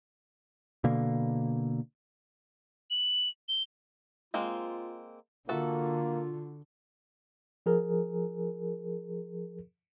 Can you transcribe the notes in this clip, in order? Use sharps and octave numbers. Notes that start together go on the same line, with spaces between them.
B2 D3 A#3
F#7
G7
G#3 A#3 C4 F4
D3 A#3 F4 F#4 A4 E5
F3 G#4 A#4